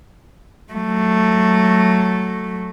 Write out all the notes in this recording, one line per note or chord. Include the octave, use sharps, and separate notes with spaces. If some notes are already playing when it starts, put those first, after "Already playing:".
F#3 A3